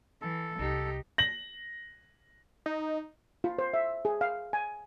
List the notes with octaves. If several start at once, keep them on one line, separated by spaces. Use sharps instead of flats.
E3 A4
C2 D#4 G4
A#6 F#7
D#4
F4
C5
E5
G#4
F5
G#5